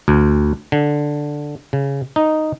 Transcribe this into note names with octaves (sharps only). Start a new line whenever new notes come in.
D2
D3
C#3
D#4